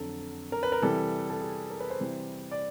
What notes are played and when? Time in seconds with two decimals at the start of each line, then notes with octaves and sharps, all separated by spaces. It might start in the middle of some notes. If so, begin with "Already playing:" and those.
Already playing: F2 D3 F#3 A4
0.52 A#4
0.63 B4
0.72 A#4
0.82 C3 E3 G3 A4
1.30 A4
1.41 G#4
1.70 A#4
1.80 B4
1.90 C5
2.00 C3 E3 G3
2.51 D5